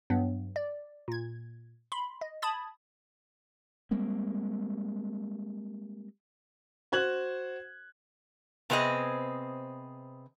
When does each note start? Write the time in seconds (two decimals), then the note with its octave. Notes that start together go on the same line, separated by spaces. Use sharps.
0.10 G2 F#3 B3
0.56 D5
1.08 A#2 G#6
1.92 B5 C6
2.21 D#5
2.42 A5 B5 D#6 G#6 A6
3.91 G3 G#3 A#3 C4
6.92 F#4 C5 F#6 G#6 F#7
8.70 C3 B3 C4 G#4 D#5